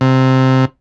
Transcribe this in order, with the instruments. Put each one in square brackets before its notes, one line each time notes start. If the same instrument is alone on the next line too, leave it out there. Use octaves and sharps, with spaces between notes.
[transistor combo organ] C3